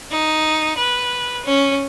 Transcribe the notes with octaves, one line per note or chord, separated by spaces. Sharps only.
D#4
B4
C#4